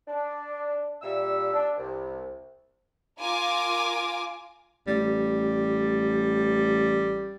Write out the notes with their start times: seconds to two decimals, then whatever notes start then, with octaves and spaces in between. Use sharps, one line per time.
0.08 D4
1.02 A#2 G3 E6
1.53 D4
1.77 C2
3.19 F4 A#4 G#5 D6
4.87 A1 G3